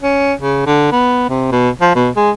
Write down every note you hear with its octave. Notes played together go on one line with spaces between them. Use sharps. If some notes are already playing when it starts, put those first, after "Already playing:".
C#4
C#3
D3
B3
C3
B2
F3
B2
G#3